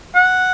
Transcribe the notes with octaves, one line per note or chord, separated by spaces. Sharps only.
F#5